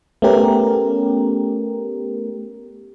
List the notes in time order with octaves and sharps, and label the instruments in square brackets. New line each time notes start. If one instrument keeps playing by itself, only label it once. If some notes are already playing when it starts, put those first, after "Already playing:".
[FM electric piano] A3 B3 C#4 G4 A#4